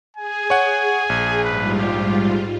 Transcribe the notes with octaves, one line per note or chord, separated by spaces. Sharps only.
G#4 G#5
C#5 F#5
A#1
G#2 G3 F4 B4
G4